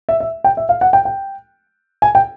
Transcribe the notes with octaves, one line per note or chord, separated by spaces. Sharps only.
E5
E5
G5
E5
F5
F#5
G5
G5
G#5
G5